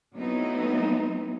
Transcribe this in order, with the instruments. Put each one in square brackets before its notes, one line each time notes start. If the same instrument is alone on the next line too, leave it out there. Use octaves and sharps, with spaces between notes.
[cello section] F#3 A3 B3 C4 D#4 E4